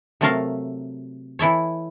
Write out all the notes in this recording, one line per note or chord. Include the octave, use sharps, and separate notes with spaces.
C3 F#3 A3 A4 A#4 F5
E3 E4 A4 C#5